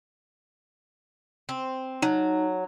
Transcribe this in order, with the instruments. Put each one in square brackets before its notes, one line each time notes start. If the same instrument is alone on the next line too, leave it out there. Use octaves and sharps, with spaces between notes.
[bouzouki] C4
[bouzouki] F#3 [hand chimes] D#4